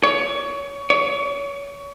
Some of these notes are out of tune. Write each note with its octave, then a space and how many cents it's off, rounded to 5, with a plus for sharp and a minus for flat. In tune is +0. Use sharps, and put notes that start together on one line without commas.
C#5 +25
C#5 +30